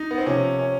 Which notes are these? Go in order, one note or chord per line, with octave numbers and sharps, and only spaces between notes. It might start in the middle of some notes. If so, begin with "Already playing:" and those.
Already playing: D#4
B3
C4
C3 F3 C#4
C#4